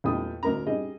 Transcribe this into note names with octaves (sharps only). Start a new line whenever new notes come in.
E2 A#2 G3 A3 G5 D#6
D2 A#4 A#5
G3 G#4 D#5